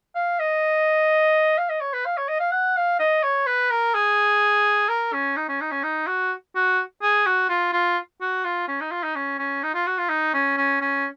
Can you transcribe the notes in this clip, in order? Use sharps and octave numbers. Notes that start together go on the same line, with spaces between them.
F5
D#5
F5
D#5
C#5
B4
F5
C#5
D#5
F5
F#5
F5
D#5
C#5
B4
A#4
G#4
A#4
C#4
D#4
C#4
D#4
C#4
D#4
F#4
F#4
G#4
F#4
F4
F4
F#4
F4
C#4
D#4
F4
D#4
C#4
C#4
D#4
F4
F#4
F4
D#4
C#4
C#4
C#4